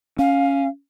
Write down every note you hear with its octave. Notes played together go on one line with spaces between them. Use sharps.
C#4 F5